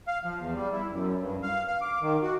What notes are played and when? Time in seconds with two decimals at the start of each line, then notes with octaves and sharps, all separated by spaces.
0.07 F5
0.24 F3
0.39 E2
0.55 G3
0.73 E4
0.91 F#2
1.19 G2
1.43 F5
1.68 F5
1.81 D6
2.02 D#3
2.23 F#4